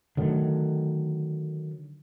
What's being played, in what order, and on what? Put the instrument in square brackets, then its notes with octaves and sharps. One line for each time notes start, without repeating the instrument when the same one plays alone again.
[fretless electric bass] D3 D#3 F#3 A3